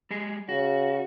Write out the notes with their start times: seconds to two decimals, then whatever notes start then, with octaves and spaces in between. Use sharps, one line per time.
0.11 G3 G#3 G#4
0.49 C#3 F#4